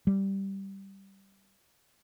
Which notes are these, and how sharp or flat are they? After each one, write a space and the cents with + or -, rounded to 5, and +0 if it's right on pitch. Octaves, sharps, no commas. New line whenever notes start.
G3 -5